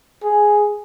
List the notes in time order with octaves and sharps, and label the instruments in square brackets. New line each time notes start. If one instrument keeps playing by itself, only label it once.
[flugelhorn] G#4